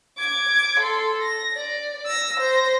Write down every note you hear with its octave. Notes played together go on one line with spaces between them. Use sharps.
D6 G#6
A4 C6
A#6
D5
E6 A#6
C5 A#6